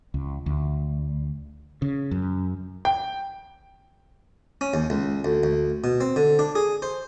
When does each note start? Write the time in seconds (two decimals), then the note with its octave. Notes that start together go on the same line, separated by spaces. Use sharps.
0.14 C#2
0.46 D2
1.82 C#3
2.11 F#2
2.85 G5
4.61 C#4
4.74 D#2
4.90 C#2
5.25 D2
5.43 D2
5.84 B2
6.01 C4
6.16 D3
6.39 D4
6.55 G#4
6.82 C5